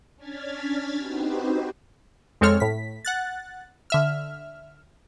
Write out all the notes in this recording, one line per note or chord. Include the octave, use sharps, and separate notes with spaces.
C#4 D4 F6 G#6 A6 B6
C4 D#4 F#4 G4 B4 C5
F2 G#3 C4 A4 C#5 F6
A2 B6
F#5 F#6 A6
D3 E5 F6